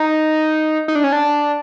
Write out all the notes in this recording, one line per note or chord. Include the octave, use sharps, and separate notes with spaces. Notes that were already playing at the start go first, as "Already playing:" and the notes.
Already playing: D#4
D#4
D4
C#4
D4